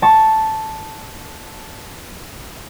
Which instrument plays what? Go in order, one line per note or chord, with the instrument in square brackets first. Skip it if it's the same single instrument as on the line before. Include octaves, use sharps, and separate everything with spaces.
[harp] A5 C#6